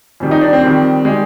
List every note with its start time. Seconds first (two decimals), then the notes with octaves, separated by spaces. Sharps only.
0.20 F2 D#3 G3
0.31 D#4
0.41 D4
0.53 C4
0.63 F2 D#3 G3
1.05 D#3 G3 G#3